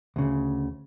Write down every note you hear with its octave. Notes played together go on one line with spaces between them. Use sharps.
D2 C#3